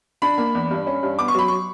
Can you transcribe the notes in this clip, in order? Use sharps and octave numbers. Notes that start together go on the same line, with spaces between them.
D4 B5
A#3
E2
G2
C#4
G2
B3 D6
C#6
F#3 B5
C#6